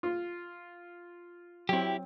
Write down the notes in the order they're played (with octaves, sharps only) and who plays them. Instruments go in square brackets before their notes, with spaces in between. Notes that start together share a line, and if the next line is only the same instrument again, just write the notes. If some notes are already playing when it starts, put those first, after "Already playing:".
[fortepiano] F4
[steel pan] F#3 C4 [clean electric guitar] E4 G4